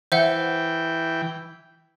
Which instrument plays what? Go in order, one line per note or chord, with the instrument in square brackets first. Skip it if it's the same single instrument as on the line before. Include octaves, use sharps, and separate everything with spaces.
[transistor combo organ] E3 G5 [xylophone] C5 E5 F#5